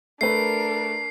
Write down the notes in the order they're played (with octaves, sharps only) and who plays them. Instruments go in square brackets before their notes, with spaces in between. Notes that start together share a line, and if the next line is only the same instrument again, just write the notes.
[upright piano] A3 B4 [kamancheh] D4 A#4 [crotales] C7